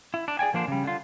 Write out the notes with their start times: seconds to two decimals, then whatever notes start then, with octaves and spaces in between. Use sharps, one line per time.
0.14 E4
0.28 D4
0.39 G#4 D5 G5 G#5
0.53 D3 F3 A#3 D4 C5
0.68 C#3 G3
0.84 D3 F4